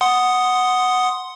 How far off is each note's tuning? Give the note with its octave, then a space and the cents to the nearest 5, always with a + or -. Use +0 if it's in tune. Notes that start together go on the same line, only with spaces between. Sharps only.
F#5 +0 C6 +0 D#6 +0